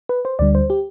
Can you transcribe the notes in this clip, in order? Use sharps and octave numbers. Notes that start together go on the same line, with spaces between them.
B4
C5
D2 D3 G3 D5
C5
G4